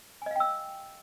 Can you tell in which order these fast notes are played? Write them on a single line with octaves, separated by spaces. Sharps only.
G#5 D#5 F5 G5 E6